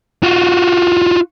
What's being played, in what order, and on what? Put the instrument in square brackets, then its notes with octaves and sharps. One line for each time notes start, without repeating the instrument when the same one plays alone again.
[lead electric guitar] F4 F#4